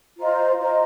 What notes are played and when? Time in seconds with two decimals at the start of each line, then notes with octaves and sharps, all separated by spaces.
0.18 F4 C5 D#5 A#5
0.60 F4 C5 D#5 A#5